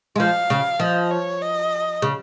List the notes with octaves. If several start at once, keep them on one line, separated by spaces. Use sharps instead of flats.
G#3
F3 F5
C#3
F3 D#5
C#5
D#5
C#3